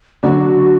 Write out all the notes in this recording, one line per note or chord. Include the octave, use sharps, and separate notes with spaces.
D3 F#3 D4 F#4